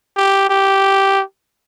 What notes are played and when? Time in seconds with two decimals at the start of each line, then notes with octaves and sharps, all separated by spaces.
0.16 G4
0.50 G4